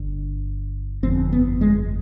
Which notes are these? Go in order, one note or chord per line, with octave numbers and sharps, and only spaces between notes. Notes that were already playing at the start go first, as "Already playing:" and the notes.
Already playing: G1 G2 D3
G1 F2 D3 C4
B3
G#3